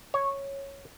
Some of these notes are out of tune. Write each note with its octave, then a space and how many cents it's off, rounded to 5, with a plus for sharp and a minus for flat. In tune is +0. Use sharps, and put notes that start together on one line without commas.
C#5 -5